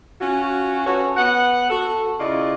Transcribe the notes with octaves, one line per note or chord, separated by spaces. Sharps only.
C#4 F4 F#4
C#4 F#4 A4 B4 C#5
B3 F#5
F#4 A4
C#3 E4 F4 D5 D#5